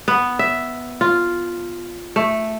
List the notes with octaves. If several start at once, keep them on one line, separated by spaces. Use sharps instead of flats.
B3
E5
F4
A3